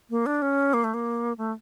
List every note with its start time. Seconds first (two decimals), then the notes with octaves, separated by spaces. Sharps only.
0.10 A#3
0.26 D4
0.42 C#4
0.74 A#3
0.84 A3
0.94 A#3
1.38 A3